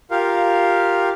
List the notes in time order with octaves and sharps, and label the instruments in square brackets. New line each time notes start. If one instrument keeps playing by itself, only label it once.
[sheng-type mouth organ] F4 G4 A#4 F5